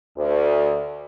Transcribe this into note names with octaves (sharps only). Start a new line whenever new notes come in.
D2